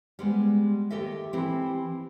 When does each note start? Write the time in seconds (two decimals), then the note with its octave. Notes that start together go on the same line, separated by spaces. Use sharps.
0.19 G3 G#3 B3
0.90 D#2 G4 A4 D#5 E5
1.33 E3 C4 E4 G4